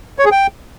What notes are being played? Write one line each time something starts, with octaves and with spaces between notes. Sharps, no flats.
C#5
G#4
G5